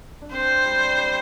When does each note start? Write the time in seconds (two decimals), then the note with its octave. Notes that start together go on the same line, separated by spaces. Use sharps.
0.22 D4
0.32 C4 C5
0.65 G3
0.98 G3